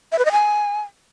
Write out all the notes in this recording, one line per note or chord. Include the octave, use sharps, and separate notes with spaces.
E5
B4
D#5
G#5